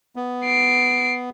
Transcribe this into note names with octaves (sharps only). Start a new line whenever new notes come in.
B3
C7 D7